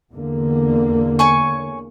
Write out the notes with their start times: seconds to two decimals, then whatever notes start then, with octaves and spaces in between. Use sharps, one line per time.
0.12 E2 D3 A#3
1.19 C#5 G#5 C#6